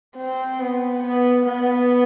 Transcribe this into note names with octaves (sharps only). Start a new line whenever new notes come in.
C4
B3
B3
B3